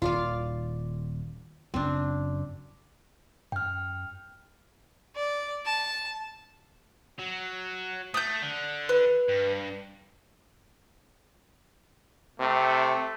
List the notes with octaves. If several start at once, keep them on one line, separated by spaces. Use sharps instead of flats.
D#1 D#3 F4 D5 F5
F#1 F#2 F#3 C4 D4
F#2 G5 F6
D5
A5
F#3
A3 D#6 G6
D3
B4
G2
C3 A3